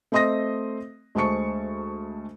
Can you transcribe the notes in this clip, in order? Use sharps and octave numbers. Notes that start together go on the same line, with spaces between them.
A3 C4 D#5 C6 D#6 A#6
D2 G#3 C5 A5 C#6 C#7